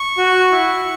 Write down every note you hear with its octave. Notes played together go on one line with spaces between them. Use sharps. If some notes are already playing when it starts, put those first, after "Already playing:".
Already playing: C#6
F#4
E4